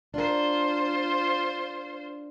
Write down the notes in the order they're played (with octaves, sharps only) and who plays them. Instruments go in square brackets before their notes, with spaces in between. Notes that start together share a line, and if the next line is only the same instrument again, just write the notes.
[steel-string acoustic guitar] D4 A#4 [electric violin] F4 C5